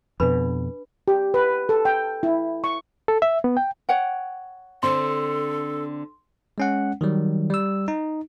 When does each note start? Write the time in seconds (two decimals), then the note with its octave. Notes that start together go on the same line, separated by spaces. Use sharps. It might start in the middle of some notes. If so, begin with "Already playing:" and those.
0.20 F2 B2 D4 B4 B5
1.08 G4
1.34 B4
1.69 A4
1.85 G5
2.23 E4
2.64 C#6
3.08 A4
3.22 E5
3.44 B3
3.57 G5
3.89 C#5 F#5 G5
4.83 D3 C4 A4 C6
6.58 G#3 C#4 F#5
7.01 D#3 F#3 G3
7.50 G3 E6
7.88 D#4